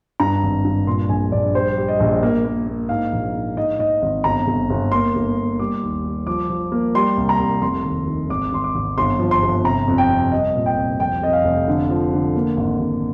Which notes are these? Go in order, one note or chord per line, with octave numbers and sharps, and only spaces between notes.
G2 A#5
G#1
G2
A#2 C6
A#1 G#5
A#1 D5
G3 C5
G3
D#5
A#1
A#3
A#3
A#3
G#2 F5
A#1
G#2
G#2 D#5
G#2 D#5
G#1
G1 A#5
G1
G1
A#3 C6
G1
A#3
G3 D6
D#2
G3
F3 D6
F3
A#3
G3 C6
C2
A#5
C2
F1 C6
D#2
D#3
G#1 D6
G#1 C6
D6
G#1
G1 C6
F3
C6
G1
C3 A#5
F2
G5
C3
G3 D#5
A#2
G5
C2
F2 G5
F2 D#5
F5
F1
D3
F3
D3
A#3
G#1
G#1